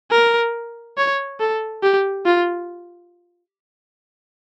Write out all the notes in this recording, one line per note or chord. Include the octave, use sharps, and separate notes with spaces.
A#4
C#5
A4
G4
F4